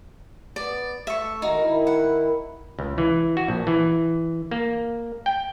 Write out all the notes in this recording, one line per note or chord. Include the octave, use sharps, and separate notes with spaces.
B3 D5
A3 E5 C#6
D#3 G#3 D#4 F#4 A#4
D#3 E4
F#5
C#2
E3
F#4
A#1
E3
A#3
G5